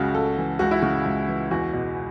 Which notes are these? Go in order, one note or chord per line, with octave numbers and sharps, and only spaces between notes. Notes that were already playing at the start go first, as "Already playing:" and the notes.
Already playing: C#2 C#3 F#4
C#2 A4
E3
C#2 F#4
E4
C#3 F#4
C#2
E3
E2 F#4
B2